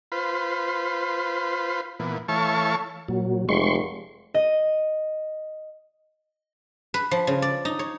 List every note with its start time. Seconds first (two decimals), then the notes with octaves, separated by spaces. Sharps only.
0.12 F4 B4 C5
1.99 A#2 E3 B3
2.28 E3 A3 C#5 F5 A5 C#6
3.08 A#2 F#3
3.49 F1 G#3 C6 C#6
4.34 D#5
6.94 B4
7.11 F3
7.27 C#3
7.42 D5
7.65 D#4
7.79 C#5